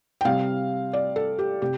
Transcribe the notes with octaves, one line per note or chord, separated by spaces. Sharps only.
G5
C3 G3 C4 F5
D5
A4
G4
C3 G4